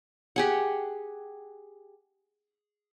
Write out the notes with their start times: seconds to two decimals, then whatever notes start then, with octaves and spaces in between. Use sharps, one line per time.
0.36 G4 G#4 F#5